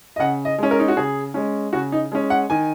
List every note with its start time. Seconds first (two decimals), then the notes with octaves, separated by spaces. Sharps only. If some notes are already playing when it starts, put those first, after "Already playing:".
0.16 D#5
0.19 C#3 F#5
0.45 D#5
0.58 G#3 C#4
0.71 A#4
0.79 D#4
0.88 F#4
0.97 C#3 G#4
1.34 G#3 C#4
1.73 C#3 F#4
1.92 D#4
2.12 G#3 C#4
2.30 F#5
2.50 D#3 G#5